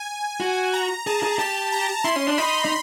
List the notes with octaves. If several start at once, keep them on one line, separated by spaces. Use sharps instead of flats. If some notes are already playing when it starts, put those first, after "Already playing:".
Already playing: G#5
F#4
A#5
G#4 A5
G#4
G4 A5
A#5
E4 C6
C#4
D4
D#4 B5
D#4